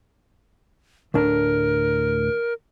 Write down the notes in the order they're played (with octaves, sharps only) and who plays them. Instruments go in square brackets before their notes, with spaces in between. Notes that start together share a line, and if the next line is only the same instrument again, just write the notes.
[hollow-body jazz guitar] D2 A2 D4 [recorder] A#4